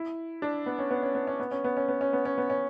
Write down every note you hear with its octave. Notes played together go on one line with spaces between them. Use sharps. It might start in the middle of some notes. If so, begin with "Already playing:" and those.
Already playing: E4
D4
B3
C#4
B3
C#4
B3
C#4
B3
C#4
B3
C#4
B3
C#4
B3
C#4
B3
C#4